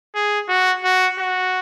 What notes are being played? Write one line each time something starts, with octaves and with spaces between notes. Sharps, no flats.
G#4
F#4
F#4
F#4